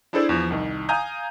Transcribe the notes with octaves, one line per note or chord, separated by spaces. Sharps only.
D4 E4 G#4 A4 C5 D5
E2 F3
C2 D#3
F5 G#5 A#5 D#6 G6